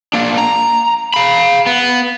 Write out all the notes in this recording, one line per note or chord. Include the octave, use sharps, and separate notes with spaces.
A#3 D4
A#5
F5 B5
B3